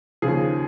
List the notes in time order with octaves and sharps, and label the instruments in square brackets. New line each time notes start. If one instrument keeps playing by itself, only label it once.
[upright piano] D#2 C#3 F3 G#4